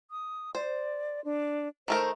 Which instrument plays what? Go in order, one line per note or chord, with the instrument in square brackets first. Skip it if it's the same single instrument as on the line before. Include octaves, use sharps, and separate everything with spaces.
[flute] D#6
[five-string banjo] C5 [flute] D5
[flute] D4
[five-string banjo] D#3 A3 A#4 [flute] C5